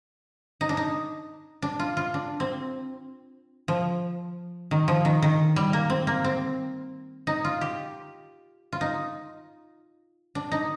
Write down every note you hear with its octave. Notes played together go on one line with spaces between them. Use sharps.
D#4
D4
D#4
D4
F4
F4
D4
C4
F3
D#3
F3
D#3
D#3
G3
A#3
C4
A#3
C4
D#4
F4
G4
F4
D#4
D4
D#4